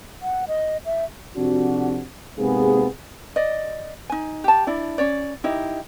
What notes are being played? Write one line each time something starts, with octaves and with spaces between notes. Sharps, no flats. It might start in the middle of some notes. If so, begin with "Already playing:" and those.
F#5
D#5
E5
F2 C3 D4 F#4
G#2 C3 A#3 B3 G#4
D5 D#5
D#4 G#5
G4 A5
D4 E4 D5
C#4 C#5 D5
D#4 E4 G4 D#5